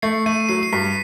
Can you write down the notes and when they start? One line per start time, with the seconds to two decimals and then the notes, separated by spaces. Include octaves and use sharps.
0.02 A3 C7
0.26 A3 D#7
0.40 D#7
0.49 F#3 C7
0.63 C7
0.73 G2 B6